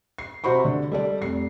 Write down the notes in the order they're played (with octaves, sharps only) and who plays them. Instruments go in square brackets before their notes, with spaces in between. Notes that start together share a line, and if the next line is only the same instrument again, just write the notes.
[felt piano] C7
C3 F#4 C5 B5 C#6
D3
G3 A4 D5
F1 C7